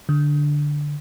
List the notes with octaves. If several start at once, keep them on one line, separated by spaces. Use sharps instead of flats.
D3